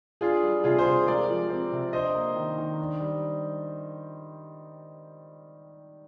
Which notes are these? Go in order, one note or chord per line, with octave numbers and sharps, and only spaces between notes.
D4 F4 G#4
G3
C3 F4 G#4
G#4 C5
C3
G#3 A#4 D5
F3
C4
C3
D4 C5 D#5
A#3
D#3
D#3
D4
G3